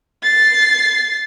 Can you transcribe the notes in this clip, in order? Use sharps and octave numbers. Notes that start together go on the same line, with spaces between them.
A6 C7